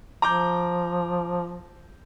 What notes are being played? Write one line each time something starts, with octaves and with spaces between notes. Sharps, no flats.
F3 A#5 D6 G6